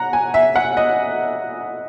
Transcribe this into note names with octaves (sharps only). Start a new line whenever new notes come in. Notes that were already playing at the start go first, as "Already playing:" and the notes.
Already playing: F#5 A#5
G#5
E5
F#5
D#5